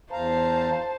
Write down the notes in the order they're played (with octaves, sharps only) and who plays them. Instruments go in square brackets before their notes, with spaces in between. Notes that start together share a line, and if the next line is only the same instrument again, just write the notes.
[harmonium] E2 F5 A#5 [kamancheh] C5 A5